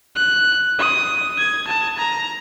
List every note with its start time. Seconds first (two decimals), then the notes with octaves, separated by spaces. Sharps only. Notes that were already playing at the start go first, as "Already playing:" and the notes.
0.16 F#6
0.79 D#6
1.39 G#6
1.68 A5
1.98 A#5